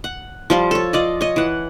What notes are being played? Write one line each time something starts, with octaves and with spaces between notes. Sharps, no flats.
F#5
F3 G3 F4
A4 C#5
F4 D5 D#5
C#5 D#5
E3 F#5